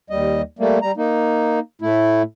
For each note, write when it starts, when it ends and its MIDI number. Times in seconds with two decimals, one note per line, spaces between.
0.10 0.42 39
0.10 0.42 55
0.10 0.42 75
0.59 0.79 55
0.59 0.79 57
0.59 0.79 58
0.82 0.92 55
0.82 0.92 82
0.97 1.59 58
0.97 1.59 63
1.82 2.22 45
1.82 2.22 57
1.82 2.22 64